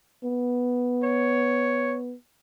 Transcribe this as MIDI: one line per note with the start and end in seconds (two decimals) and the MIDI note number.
0.24 2.14 59
1.03 1.96 73